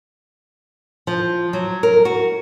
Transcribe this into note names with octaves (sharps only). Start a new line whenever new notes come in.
F3
F#3
A#4
F#4